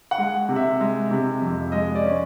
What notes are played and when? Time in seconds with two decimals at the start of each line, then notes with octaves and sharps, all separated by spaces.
0.11 F#5
0.18 G#3
0.49 C3
0.56 E5
0.81 G#3
1.11 C3
1.42 F2
1.72 G#3 D#5
1.95 D5
2.04 C#4